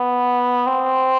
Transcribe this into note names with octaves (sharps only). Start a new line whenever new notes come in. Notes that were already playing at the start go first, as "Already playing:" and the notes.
Already playing: B3
C4